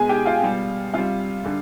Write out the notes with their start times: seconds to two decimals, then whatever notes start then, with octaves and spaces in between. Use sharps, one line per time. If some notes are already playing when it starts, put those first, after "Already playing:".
Already playing: B2 G#3 G#4 G#5
0.09 G4 G5
0.25 F4 F5
0.42 B2 G3
0.94 C3 G3 F4 F5
1.44 D3 G3